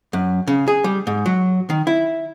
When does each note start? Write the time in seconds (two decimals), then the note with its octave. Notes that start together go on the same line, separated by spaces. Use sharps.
0.13 F#2
0.48 C#3
0.68 G#4
0.84 G3
1.07 G#2
1.26 F#3
1.70 D#3
1.87 E4